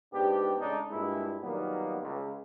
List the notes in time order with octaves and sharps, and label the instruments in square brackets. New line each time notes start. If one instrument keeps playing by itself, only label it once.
[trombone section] A#1 G#2 B3 D4 G4
A2 C#3 G#3 D4 D#4
G2 A#2 G#3 E4
A#2 D#3 F#3 G3 A#3 B3
C#2